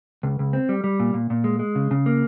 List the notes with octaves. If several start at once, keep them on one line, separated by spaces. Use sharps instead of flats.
C#2
C#2
C4
G3
G3
A#2
A#2
A#2
G#3
G#3
C#3
C#3
A#3